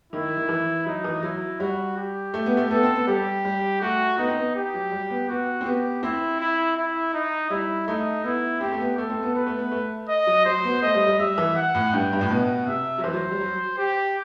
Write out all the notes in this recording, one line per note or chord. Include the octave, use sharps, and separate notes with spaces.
D#3 E4
D#3
E3
F#3 D#4
E3
F#3 E4
G3 F#4
G4
A3
B3
A3
B3 A4
C4
B3
G3 G4
G3
A3 F#4
B3 D#4
C4
B3
G4
F#3
G3
B3
B3 F#4
C4
B3 G4
C4 E4
E4
E4
D#4
G3 E4
A3 D#4
B3 E4
C4 G4
A3
B3
A3 A4
C4
B3
B3 B4
A3
B3
A3
D#5
F#3
F#3 C5
B3
A3 D#5
G3
G3
G3 E5
E3
F#5
A2
G2 G5
G2
A2
B2 F#5
C3 E5
F#3
E3 C5
F#3
G3
F#3
G4